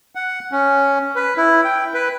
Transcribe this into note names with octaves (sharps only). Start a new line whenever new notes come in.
F#5
C#4
B4
E4
G5
B4